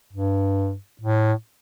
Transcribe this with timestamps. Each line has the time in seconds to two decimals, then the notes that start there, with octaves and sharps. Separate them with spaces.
0.13 G2
1.02 A2